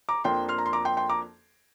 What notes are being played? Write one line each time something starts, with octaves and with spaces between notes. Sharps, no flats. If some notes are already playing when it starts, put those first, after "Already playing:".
A#5 D6
F2 F3 A#3 D4 G5 C6
C6 F6
A#5
C6
A#5 D6
G5 C6
G5 C6
A#5 D6